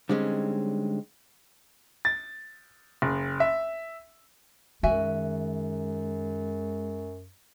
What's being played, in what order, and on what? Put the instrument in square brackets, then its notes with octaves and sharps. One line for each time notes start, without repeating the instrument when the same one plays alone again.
[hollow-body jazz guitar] D3 G3 G#3 C4 C#4 D#4
[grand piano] A6
F#1
E5
[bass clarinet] F#2 [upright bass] D#3 [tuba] G#3 [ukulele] F#4 E5 G#5